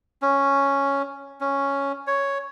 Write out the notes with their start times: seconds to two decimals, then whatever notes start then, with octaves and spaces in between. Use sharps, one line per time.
0.22 C#4
1.41 C#4
2.07 C#5